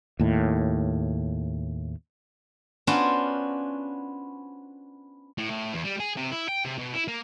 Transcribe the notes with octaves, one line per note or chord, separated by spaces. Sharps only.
D#2 A2
B3 C#4 D4 F4 F#4 C5
A2
A2
E2
G3
G#4
C3
E4
G5
C3
B2
E4
A#3